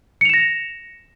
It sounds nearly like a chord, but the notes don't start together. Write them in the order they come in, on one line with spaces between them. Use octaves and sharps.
C#7 F7 E7 A#6